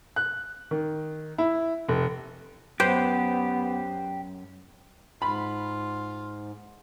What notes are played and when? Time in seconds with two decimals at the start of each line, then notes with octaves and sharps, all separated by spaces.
0.16 F#6
0.71 D#3
1.38 E4
1.88 F1
2.80 F#2 B3 G4 B4 C5
5.22 G#2 F4 B5